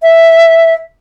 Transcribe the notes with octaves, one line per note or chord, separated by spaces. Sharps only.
E5